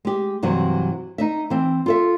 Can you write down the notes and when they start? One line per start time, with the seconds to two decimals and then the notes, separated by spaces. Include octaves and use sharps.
0.05 G#3 G4
0.43 G2 C3 E3 F#3
1.18 D#4 D#5 E5
1.50 E3 C4
1.86 F4 A4 E5